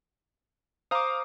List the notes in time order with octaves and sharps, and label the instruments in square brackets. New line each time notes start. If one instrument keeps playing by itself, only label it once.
[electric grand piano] C5 F5 A#5 [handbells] D6 D#6